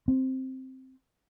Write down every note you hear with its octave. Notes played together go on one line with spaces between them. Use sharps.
C4